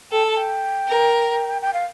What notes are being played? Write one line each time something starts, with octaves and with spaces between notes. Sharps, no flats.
A4 G5
A5
G5
A#4
G5
F5